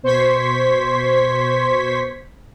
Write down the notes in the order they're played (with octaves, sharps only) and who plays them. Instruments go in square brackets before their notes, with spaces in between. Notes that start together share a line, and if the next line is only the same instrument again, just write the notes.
[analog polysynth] B2 C5 C6 C#6 G#6 B6